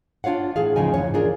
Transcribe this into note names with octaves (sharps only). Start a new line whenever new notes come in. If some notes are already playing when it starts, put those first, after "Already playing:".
D4 F4 C#5 F5 F#5
A2 E3 G#4 F5
D2 G#2 C#3 F3 D#4 G#5
E2 G#2 E3 C#5
D4 F4 G#4 A#4